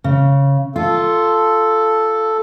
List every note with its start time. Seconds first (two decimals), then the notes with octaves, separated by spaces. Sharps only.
0.04 C#3
0.76 F4 A4